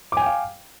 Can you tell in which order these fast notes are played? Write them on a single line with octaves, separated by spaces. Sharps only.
D6 G#5 G5 F5